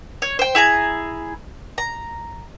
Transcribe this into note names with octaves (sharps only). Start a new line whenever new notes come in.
C#5
C5 G5
E4 G#4 G#5 A#5
A#5